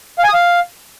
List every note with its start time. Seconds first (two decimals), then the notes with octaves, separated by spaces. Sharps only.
0.18 F5
0.24 G#5
0.29 D#6
0.34 F5